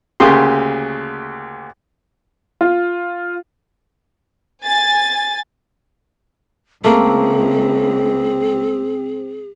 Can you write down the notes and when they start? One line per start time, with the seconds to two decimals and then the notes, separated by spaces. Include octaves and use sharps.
0.20 D2 C#3 A#3 G4 C6
2.61 F4
4.65 G#5 A6
6.84 C#2 A3 A#3 C4 G#4